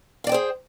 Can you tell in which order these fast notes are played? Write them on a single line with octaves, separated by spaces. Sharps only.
F5 D5 G5 C5 G#4